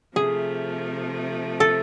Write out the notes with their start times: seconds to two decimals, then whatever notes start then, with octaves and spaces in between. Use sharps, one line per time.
0.15 C3 F3 A3 G#4
1.60 A4